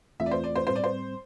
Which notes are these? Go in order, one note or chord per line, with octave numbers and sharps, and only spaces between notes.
E2 E3 A3 C4 F4 E5
D5
C5
D5
C5
A2 G3 C4 C5
D5
C5